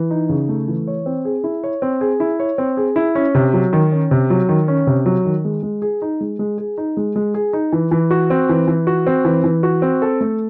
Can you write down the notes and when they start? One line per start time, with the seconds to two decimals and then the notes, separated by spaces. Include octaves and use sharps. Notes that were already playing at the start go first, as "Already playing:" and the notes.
Already playing: E3
0.11 D#4
0.29 C#3
0.49 A3
0.68 E3
0.87 C#5
1.06 C4
1.25 G#4
1.44 E4
1.64 C#5
1.82 C4
2.01 G#4
2.20 E4
2.40 C#5
2.58 C4
2.77 G#4
2.96 E4
3.15 C#4
3.35 C3
3.53 F#3
3.73 D#3
3.92 C#4
4.11 C3
4.30 F#3
4.49 D#3
4.68 C#4
4.87 C3
5.06 F#3
5.25 D#3
5.44 G#3
5.63 G#3
5.82 G#4
6.02 D#4
6.21 G#3
6.39 G#3
6.58 G#4
6.78 D#4
6.97 G#3
7.16 G#3
7.34 G#4
7.53 D#4
7.72 E3
7.91 E3
8.11 F#4
8.30 C4
8.49 E3
8.68 E3
8.87 F#4
9.07 C4
9.25 E3
9.44 E3
9.63 F#4
9.82 C4
10.02 A4
10.21 A3